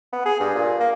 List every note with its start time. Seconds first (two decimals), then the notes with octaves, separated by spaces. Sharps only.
0.13 B3
0.25 G#4
0.40 G2
0.55 A#2
0.80 A#3